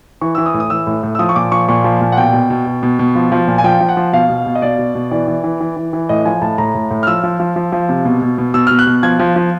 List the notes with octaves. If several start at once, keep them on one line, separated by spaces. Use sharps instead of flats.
E3 C#6
E3 E6
D#6
A2
D#6
E3 E6
A2
A2
E6
F3 D#6
C#6
A#2 D6
F3 C#6
A#2 C#6
F3
A#2
F#5
B2 G5
B2
B2
B2
B2
B2
F3
F3
A#2
G#5
F3 G5
F3
F#5
F3
B2 F5
B2
B2
D#5
B2 D5
B2
B2
E3 D5
E3
E3
E3
E3
E3
A2 D#5
F3 G#5
A2 A5
A2 A#5
A2
A2
F6
F3 E6
F3
F3
F3
F3
C3
B2
B2
B2
B2 E6
B2 F6
F#6
B2
F3 G#6
F3
F3